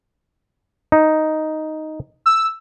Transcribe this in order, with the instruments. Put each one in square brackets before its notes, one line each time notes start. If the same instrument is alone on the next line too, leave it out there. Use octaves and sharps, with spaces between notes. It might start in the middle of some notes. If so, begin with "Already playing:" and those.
[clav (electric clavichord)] D#4
[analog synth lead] E6